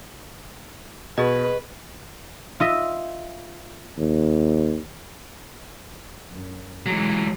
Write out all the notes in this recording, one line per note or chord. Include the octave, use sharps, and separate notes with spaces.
B2 G#4 B4 D#5
F4 D#5 E5
D#2
F#2
E3 F#3 G#3